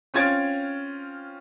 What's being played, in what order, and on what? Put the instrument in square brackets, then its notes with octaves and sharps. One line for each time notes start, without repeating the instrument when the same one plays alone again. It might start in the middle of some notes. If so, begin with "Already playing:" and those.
[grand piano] C4 C#4 F4 G#6 A6 D7